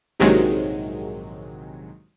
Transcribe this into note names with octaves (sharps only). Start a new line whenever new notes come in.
A#1 G#2 C3 D#3 F#3 G#3